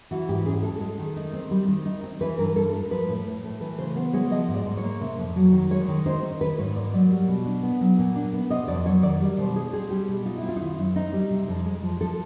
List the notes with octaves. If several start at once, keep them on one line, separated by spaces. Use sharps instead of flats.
E3 F#4
G#2 G4
C#4 G#4
G#3 A4
G#3
D#3
D#4
C4
G3
D#3
D#4
C4
E3 B4
G2 A#4
G2 A4
G#3 A#4
F3 B4
A2
A2
A3
E3 B4
C#3 C5
B3 C5
G#3 C#5
F3 D#5
G#2
D5
G#2
C#5
A#3
C3
F2
F#3
D#3
G#3 C#5
D#3
D#4 C5
C4
D#3 B4
G#2 C#5
A#3 D5
F#3 D5
G3
B2
D4
B3
F#3
A#2
D4
B3
C3 D#5
F2 D5
F#3 C#5
D#3 D5
G3 D5
B2 C5
D#4 G#4
C4 G#4
G3 G4
B2
D#4 F4
E4
C4
F4
D#4
D#3 E4
F#2
C4 D#4
G3
C3
F2
G#3
F3
F3 A4